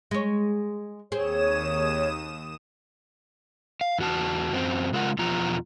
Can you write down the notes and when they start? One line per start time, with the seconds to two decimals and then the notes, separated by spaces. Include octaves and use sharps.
0.11 G#3 C#5
1.12 D#2 C4 G#4 C#5 D#6 E7
3.81 F5
3.99 E2 F#4 A5
4.53 F#2 F#3 C4
4.93 C#3 G#3 F4 A#4 F#5
5.18 E2 B2 F3 F4 A#5